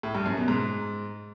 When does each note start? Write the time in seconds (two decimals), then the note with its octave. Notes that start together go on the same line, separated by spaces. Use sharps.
0.03 A2
0.15 G2
0.26 F#2
0.37 B2
0.48 G#2